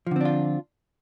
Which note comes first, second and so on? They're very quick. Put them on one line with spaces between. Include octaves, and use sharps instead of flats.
F3 D3 C4 D4 F4